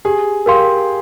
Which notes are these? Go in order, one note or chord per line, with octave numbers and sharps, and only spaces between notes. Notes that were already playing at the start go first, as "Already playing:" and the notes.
G4 G#4
G4 A#4 F5 C6